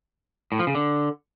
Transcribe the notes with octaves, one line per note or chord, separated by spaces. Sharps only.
A2
F3
C#3
D3